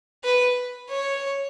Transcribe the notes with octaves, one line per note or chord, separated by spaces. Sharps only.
B4
C#5